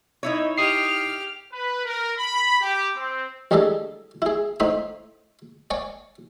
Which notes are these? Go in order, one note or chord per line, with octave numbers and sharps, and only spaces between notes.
D#4 E4 C#5
G4 D#6 F6 C7
B4
A#4
B5
G4
C4
A1 G3 D4 G#4 A4 D#5
E4 G#4
A2 C4 D#4 B5 D#6
C#5 D5 G#5 C#6